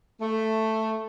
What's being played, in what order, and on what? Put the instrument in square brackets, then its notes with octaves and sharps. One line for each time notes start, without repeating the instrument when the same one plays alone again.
[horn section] A3